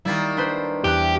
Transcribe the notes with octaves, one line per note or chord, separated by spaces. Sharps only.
D#3 G3 A#3 E4 A6
D4 B4 C5
E2 G4 F#6